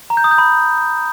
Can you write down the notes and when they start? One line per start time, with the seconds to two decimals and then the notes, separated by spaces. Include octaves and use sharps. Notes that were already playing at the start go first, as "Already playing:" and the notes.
0.10 A#5
0.17 G6
0.24 D#6
0.31 G6
0.38 B5